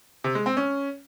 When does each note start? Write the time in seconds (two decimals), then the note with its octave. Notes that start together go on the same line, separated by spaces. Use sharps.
0.24 C3
0.35 G#3
0.46 C4
0.57 C#4